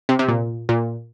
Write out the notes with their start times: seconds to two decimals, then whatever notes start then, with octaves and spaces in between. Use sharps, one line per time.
0.09 C3
0.19 C3
0.28 A#2
0.69 A#2